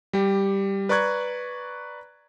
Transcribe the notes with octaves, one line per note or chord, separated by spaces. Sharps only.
G3 G4
B4 D5 A#5 C#6 F#6 G#6